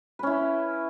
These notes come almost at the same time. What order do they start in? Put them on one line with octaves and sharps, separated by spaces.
B4 C#4 E4